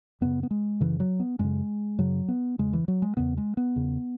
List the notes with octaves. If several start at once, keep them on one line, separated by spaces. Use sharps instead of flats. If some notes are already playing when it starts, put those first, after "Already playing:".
F#2 C#3 B3
B3
G#3
F#2 C#3 E3
F#3
B3
F#2 C#3 G#3
F#2 C#3 F#3
B3
E2 C#3 G#3
E3
F#3
G#3
E2 C#3 B3
G#3
B3
E2 C#3